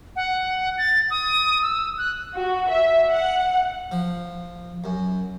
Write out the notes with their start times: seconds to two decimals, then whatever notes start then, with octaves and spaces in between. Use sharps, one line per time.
0.16 F#5
0.78 A6
1.11 D#6
1.63 E6
1.98 F#6
2.35 F#4
2.69 E5
3.09 F#5
3.91 F3
4.84 F#2